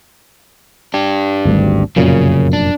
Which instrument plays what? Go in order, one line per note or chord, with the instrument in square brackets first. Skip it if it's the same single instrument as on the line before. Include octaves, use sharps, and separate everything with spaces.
[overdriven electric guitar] D4 G4
[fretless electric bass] G#1 D2 G3
[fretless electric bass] F1 F#2 A#2 [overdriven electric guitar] C#3
[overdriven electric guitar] D4